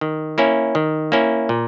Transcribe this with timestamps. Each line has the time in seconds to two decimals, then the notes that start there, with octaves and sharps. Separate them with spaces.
0.01 D#3
0.38 A#3 C#4 E4
0.75 D#3
1.12 A#3 C#4 E4
1.49 A#2